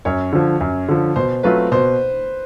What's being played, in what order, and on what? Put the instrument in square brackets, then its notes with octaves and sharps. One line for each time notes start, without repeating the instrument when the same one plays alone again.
[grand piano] F#2 [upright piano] C#5
[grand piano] D3 F3
F#2
D3 F3
[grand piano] B2 [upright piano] C5
[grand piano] F#3 A3 C4 F4 [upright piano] B4
[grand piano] B2 [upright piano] C5